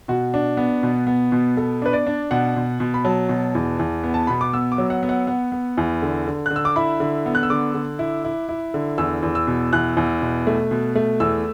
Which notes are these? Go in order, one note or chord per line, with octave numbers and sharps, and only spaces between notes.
B2 F#4
D4
B3
B2
B3
B2
B3 A4
D4 B4
D5
D4
B2 F#5
B2
B2
B5
F#3 A5
B2
E2
E2
B3
A5
B2 B5
D6
B3 E6
D6
F#3
F#5
B3
F#5
B3 F#5
B3
E2
D3
D3
D3 F#6
E6
D6
E4 B5
D3
B3
F#6
E6
D3 D6
D3
E4
E4
E4
D3
E2 E6
E2
E6
B2
E2 F#6
E2
B2
A3
B2
A3
E2 E6